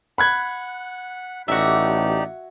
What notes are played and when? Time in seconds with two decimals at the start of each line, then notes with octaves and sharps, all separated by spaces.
0.18 F#5 B5 F#6 G#6
1.48 A1 A2 D#4 F#4 G4 D5 E5